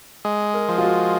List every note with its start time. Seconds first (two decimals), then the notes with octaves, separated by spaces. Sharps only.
0.25 G#3
0.54 A#4
0.69 F3
0.78 F4
0.83 F#4